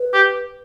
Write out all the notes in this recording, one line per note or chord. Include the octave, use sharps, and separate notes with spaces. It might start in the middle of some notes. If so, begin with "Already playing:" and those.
Already playing: B4
G4